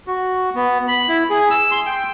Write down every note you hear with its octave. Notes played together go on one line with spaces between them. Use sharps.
F#4
B3
B5
E4
G#4
E6
C6
G5